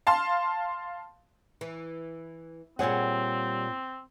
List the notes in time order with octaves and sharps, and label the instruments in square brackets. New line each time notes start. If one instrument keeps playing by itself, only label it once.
[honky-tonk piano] F5 A5 C6
[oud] E3
[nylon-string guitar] A#2 C#5 F#5 [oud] G3 G#4 [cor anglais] C4